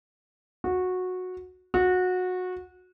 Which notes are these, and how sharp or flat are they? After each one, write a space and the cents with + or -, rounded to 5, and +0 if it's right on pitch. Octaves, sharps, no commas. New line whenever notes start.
F#4 -15
F#4 -20